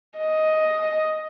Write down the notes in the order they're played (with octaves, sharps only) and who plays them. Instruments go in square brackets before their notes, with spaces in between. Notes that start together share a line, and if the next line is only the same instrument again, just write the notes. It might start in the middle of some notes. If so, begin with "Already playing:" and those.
[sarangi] D#5